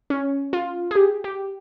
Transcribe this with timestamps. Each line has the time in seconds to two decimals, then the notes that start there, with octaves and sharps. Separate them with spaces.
0.10 C#4
0.53 F4
0.91 G#4
0.96 G4
1.24 G4